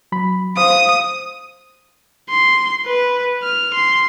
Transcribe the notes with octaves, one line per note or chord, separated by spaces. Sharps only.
F#3 B5
C5 F5 D#6
C6
B4
F6
C6